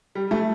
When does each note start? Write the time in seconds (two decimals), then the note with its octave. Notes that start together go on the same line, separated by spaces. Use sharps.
0.15 G3
0.31 A3